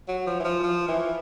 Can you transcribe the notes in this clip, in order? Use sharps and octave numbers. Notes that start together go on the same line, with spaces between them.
F#3
F3
E3
F3
F3
E3